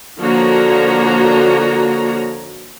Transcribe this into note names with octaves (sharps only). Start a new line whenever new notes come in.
D3 F3 A#3 F#4 C#5 A#5